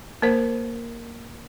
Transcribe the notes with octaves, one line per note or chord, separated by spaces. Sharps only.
A#3 A#4 C5